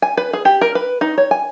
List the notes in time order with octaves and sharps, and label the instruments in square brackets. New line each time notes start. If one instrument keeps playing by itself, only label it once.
[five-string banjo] G#5
B4
G#4
G4
A#4
B4
D#4
C#5
G#5